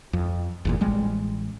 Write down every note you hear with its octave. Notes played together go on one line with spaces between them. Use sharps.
F2
G1 E2 A#2
A1 G3 G#3